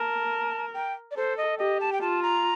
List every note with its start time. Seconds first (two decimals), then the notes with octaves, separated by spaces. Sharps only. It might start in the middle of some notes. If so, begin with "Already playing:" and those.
Already playing: A#4 A5
0.74 G5
1.11 D5
1.16 A4 C5
1.38 D#5
1.59 G4 D#5
1.80 A5
1.93 G5
2.01 F4 A5
2.23 A#5